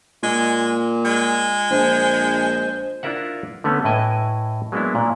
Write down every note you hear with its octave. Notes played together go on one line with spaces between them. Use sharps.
A#2 G#3
G#3
A#1 C5
D4 E4 F4 A#4 E5 F#5
D3 A3 B3 C#4
A2 E4 B4 D#5 G#5
F#3 G#3 A#3 B3 D4 E4
A#2